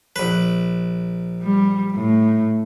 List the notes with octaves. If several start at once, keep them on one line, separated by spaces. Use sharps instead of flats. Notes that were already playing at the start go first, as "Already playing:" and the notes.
A#1 B4
G3
A2